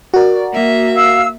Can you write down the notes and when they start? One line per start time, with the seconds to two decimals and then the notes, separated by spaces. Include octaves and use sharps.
0.14 F#4 A#4 D5
0.52 A#3 E5
0.95 F5 E6